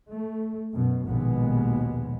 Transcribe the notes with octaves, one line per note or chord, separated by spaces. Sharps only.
A3
F#2 B2
A#1 D#2 B2 G#3 B3